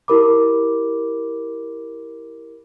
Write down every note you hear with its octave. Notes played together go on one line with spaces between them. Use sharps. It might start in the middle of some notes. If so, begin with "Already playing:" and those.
E4 G4 A#4 B5 D6